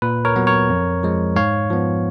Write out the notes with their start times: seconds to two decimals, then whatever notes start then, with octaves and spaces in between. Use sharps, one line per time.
0.02 A#2 B4
0.25 A#4 C#5
0.36 F#3 B3
0.47 A#4 C#5
0.70 F2
1.03 F3 G#3
1.36 G#2 C#5 F5
1.70 F3 B3